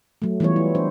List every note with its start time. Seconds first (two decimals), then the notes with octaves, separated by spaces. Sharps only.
0.22 F#3 A3
0.40 E3 G3 B3 F4 C#5
0.56 E4
0.75 D4 C5